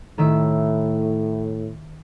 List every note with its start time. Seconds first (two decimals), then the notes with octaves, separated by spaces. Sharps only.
0.18 A2 D#3 E5 E7